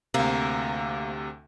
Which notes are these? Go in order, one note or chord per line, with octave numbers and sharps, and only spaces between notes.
D2 C3 A#3